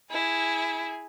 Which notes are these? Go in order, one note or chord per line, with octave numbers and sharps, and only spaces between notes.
E4 G#4